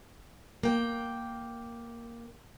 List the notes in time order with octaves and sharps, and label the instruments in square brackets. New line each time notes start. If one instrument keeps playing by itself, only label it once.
[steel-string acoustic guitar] A#3 G5